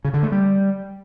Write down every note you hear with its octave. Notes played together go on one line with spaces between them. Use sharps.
C#3
D3
A3
G3